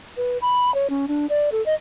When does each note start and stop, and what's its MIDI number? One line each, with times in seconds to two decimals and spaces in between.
0.17 0.38 71
0.42 0.73 83
0.74 0.90 73
0.90 1.06 61
1.08 1.26 62
1.30 1.50 74
1.52 1.64 69
1.66 1.74 75